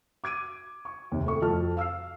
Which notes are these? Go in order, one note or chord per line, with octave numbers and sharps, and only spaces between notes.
D6 G#6 D7 D#7
C#6
D#2 C3
A2 A4 C#6
F2 A5 F6
F5 E6 F6 C7